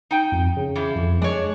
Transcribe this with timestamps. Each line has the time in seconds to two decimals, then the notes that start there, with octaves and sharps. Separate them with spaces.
0.11 D#4 G5
0.32 F2
0.56 C#3
0.75 E3 F3
0.96 F2
1.22 G#3 D4 C#5